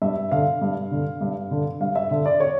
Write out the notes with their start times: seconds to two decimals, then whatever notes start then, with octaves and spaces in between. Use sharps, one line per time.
0.02 G2 E5
0.31 D3 F5
0.61 G2
0.91 D3
1.21 G2
1.51 D3
1.80 G2 F5
1.96 E5
2.11 D3
2.26 D5
2.40 C#5